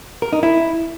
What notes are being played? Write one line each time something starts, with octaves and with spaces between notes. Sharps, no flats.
A#4
D#4
E4